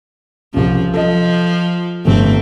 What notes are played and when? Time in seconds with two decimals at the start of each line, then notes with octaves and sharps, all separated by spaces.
0.54 C2 C#3 F3
0.94 F3 A4 D#5
2.05 G1 A2 A3 C4